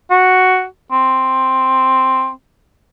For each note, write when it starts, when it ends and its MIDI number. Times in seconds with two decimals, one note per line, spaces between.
0.10 0.64 66
0.92 2.30 60